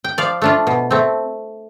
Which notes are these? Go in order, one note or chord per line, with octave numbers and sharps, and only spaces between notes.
G5
F3 D5 F5
A3 D4 F4
B2
A3 C4